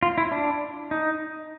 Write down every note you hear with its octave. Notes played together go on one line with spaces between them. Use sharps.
F4
E4
D4
D#4